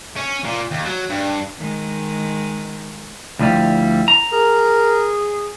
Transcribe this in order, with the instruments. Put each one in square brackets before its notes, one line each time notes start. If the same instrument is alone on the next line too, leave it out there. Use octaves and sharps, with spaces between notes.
[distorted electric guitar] C#4
A#2
D#2
F#3
G2
[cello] D#3 G#3
[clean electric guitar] D2 F3 G3 [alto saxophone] E4
[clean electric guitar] A#5
[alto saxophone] G#4 [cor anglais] A#4